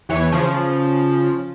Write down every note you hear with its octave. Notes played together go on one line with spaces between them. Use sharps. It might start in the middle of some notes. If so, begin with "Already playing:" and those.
E2 E3 C#5
C#3 F3